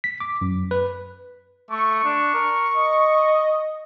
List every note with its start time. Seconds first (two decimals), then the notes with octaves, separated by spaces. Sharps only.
0.04 B6
0.20 D6
0.41 F#2
0.71 B4
1.70 A3 C#6
2.04 D4
2.34 A#4
2.76 D#5